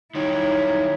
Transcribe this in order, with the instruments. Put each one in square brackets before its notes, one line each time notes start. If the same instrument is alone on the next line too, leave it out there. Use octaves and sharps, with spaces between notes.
[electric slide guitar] D#3 F#3 G3 [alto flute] D#4 [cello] E4 [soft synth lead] C#5